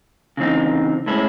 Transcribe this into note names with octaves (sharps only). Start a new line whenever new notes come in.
C#3 E3 C4 D#4
A2 G#3 C#4 E4